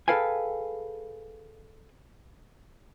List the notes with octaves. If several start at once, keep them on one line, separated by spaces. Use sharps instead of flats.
G#4 A4 B4 F5 G5 G#5